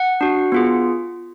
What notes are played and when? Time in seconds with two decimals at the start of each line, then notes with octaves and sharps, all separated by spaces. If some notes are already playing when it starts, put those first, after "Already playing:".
Already playing: F#5
0.21 D4 F#4
0.52 B3 F4 G#4